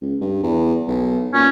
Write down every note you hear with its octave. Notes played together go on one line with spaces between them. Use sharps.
C#2
G2
E2
B1
A#2 C#4